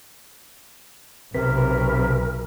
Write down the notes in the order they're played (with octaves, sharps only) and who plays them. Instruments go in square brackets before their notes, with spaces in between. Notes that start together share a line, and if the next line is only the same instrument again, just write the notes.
[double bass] B1 [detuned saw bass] C3 [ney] A#4 [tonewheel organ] B4 B5